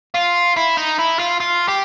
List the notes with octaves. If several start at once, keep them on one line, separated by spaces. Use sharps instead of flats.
F4
E4
D#4
E4
F4
F4
G4